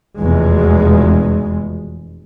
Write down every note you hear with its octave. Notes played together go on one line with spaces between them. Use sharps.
F1 E2 B2 G#3